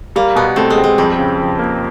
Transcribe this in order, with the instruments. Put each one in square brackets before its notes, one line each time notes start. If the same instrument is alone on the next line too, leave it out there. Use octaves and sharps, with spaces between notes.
[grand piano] G3 [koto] A#3
[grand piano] B2 [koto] B3
[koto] A3 [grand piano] C4
[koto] G#3
[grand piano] C4
[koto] G#3
[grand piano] F2 [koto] G3
[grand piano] C#3
F3
A#3